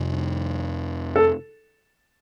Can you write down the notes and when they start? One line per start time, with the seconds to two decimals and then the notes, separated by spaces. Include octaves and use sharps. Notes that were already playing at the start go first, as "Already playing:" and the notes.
Already playing: F2 C3 G3
1.16 A4